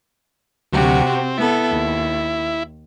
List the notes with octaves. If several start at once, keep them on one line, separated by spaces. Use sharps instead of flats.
D2 C3 F#3 F#4 G4
C4
B3 E4 A4
D#2